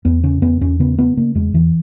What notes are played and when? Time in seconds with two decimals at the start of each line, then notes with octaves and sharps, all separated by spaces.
0.05 E2 B3
0.23 C#3 C#4
0.42 E2 B3
0.61 E2 C#4
0.79 C#3 B3
0.98 C#3 B3
1.17 C#3 A#3
1.35 E2 G#3
1.53 E2 E3